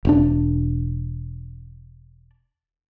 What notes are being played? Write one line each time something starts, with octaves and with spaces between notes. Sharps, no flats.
E1 C4 D4